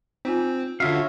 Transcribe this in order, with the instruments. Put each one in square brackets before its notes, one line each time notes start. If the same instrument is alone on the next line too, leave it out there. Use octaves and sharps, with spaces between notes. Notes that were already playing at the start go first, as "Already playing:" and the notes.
[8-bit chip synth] C4 [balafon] D#4 F4 G#5
[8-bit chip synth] D3 F4 F#4 [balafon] C#4 [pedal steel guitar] C#5 E5 F5